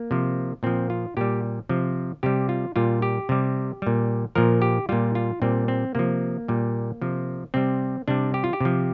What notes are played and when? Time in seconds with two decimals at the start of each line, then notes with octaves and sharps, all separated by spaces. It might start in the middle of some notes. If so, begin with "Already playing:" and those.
Already playing: A#3
0.11 C3 F3
0.63 A#2 F3 C4
0.90 F4
1.17 A#2 G3 G4
1.69 C3 F3
2.23 C3 G3 G4
2.49 F4
2.76 A#2 G3 F4
3.02 G4
3.29 C3 G3
3.82 A#2 G3
4.35 A#2 F3 A#4
4.62 G4
4.89 A#2 G3 F4
5.15 F4
5.42 A#2 G3 C4
5.68 C4
5.95 C3 F3 A#3
6.48 A#2 G3
7.02 C3 F3
7.54 C3 G3 C4
8.08 C3 G3 D4
8.34 G4
8.44 F4
8.53 G4
8.61 C3 F3